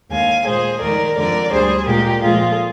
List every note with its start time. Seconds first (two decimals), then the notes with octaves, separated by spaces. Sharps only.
0.10 D#2 D3 G#3 F5 G#5
0.45 A#2 G#3 G#4 C5
0.80 D#2 D#3 G#3 A#4 D5
1.16 F2 D3 G#3 A#4 D5
1.51 D2 D3 G3 G#4 C5
1.86 A#2 G#3 G4 A#4
2.21 A#2 F3 G#3 F4 G#4